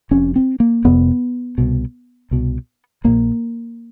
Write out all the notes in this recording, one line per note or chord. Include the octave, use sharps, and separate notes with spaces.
F1 F2 C3 C#4
C4
A#3
F1 F2 C3 B3
C2 B2
C2 B2
A#1 A#2 A#3